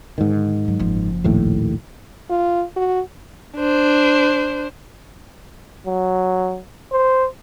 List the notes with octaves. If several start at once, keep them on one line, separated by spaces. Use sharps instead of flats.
G#2 D3 D#3
G2 F#3
F#1 F3
A#1 D#2 A2
F4
F#4
D4 C5
F#3
C5